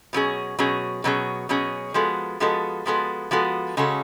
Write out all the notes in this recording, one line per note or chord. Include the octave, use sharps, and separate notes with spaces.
B2 F#3 C#4 G#4
B2 F#3 C#4 G#4
B2 F#3 C#4 G#4
B2 F#3 C#4 G#4
F3 G#3 B3 F#4 A4
F3 G#3 B3 F#4 A4
F3 G#3 B3 F#4 A4
F3 G#3 B3 F#4 A4
C#3 G#3 C#4 F#4 A4